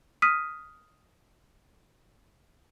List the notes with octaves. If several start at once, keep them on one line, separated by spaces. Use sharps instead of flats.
D#6 F6 B6 D#7